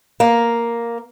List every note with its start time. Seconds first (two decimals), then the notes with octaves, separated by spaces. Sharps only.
0.20 A#3